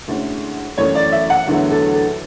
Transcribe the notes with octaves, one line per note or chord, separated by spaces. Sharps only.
D2 D3 G#3 C#4 E4
F#2 E3 A3 C#4 C#5
D5
E5
F#5
E2 D3 F#3 A3 E4
A4
A4